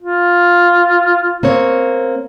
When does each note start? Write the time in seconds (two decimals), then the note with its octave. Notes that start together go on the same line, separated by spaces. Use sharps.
0.03 F4
1.43 A#3 C4 C#5